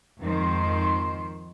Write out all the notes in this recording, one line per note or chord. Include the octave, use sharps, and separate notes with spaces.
F2 G#2 D#3 C5